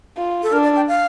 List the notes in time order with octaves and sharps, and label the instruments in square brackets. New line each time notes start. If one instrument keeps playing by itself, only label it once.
[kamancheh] F4
[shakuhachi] A4
[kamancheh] D4 [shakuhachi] A#4
[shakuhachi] D5
G5
F5